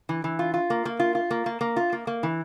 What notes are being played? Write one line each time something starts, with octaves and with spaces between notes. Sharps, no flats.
E3
E3
F4
F4
A#3
A#3
F4
F4
A#3
A#3
A#3
F4
A#3
A#3
E3